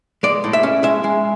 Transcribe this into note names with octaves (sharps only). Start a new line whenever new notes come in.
G#3 D5
A2
E5
C#4
G#3 E5
G#3